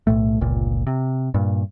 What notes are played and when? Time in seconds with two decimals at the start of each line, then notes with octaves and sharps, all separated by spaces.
0.07 B1 A2 A3
0.41 G1 C#2 A#2
0.87 C3
1.34 G2 A#2